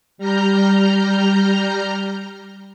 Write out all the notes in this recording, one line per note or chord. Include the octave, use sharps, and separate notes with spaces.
G3 A#5 F6 G6